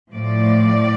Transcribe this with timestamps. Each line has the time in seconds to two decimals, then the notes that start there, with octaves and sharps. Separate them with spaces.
0.14 A2 F3 D5